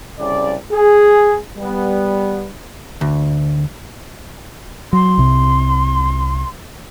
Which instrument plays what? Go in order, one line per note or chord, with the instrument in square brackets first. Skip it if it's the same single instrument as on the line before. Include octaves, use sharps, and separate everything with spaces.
[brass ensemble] C2 C#3 D5
G#4
G3 B3
[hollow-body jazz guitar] D2
[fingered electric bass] F#3 [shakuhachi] C6
[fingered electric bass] C2 C3